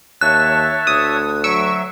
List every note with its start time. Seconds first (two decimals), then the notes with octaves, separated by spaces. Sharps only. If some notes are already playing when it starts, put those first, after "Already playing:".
0.21 D#2 C#5 E5 A5 F#6
0.87 D2 D#6
1.44 F#3 E5 C#6 E6 D7